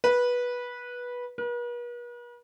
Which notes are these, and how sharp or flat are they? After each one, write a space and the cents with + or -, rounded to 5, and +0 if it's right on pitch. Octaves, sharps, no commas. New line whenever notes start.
B4 -15
B4 -45